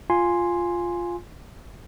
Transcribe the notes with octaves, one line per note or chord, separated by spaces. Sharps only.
F4 G#5 C6